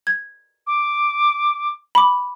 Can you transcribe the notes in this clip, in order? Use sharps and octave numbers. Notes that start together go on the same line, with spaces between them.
G#6
D6
B5 D6